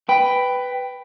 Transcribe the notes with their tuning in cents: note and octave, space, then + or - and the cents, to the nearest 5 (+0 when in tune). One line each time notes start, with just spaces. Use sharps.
B4 +10 G5 +0